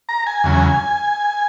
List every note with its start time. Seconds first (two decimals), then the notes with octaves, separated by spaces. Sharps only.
0.09 A#5
0.27 G#5
0.44 E2 C#3 F#3